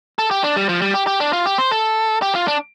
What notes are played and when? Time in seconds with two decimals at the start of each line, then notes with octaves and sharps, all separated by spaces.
0.19 A4
0.31 G4
0.44 D4
0.56 G3
0.69 F3
0.82 G3
0.94 G4
1.07 G4
1.20 D4
1.33 F4
1.46 G4
1.58 C5
1.71 A4
2.22 G4
2.35 F4
2.48 D4